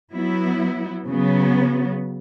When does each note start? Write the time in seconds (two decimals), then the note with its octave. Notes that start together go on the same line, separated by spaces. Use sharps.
0.11 F#3 B3 E4
1.08 C#3 F#3 B3